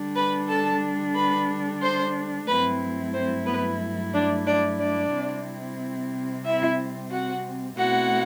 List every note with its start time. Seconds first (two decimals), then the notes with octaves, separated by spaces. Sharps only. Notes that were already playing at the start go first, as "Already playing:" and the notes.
Already playing: D3 G3 D4
0.16 B4 B5
0.48 A4 A5
1.15 B4 B5
1.82 C5 C6
2.47 G2 F#3 A3 C4 E4 B4 B5
3.13 C4 C5
3.46 B3 B4
4.14 D4 D5
4.46 D4 D5
4.79 D4 D5
5.12 C3 G3 C4 E4
6.45 E4 E5
7.11 F#4 F#5
7.77 B2 A3 C4 E4 F#4 F#5